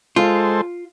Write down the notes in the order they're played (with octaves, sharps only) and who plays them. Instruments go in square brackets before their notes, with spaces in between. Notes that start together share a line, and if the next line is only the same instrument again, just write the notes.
[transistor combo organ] G#3 A4 C5 [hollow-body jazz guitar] F4